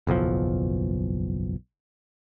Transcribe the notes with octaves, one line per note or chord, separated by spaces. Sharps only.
F#1 B1 E2 F3